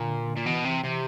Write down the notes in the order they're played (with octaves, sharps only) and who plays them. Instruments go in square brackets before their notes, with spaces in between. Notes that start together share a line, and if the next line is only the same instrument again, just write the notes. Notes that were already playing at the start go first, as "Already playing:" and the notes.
Already playing: [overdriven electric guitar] A#2 [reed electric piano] D3
[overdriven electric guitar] A#2
[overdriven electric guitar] B2 [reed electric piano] E3
[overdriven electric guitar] C3
C3